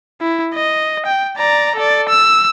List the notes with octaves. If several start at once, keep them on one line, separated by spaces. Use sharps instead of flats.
E4
D#5
G5
D5 A#5
A4 D5
E6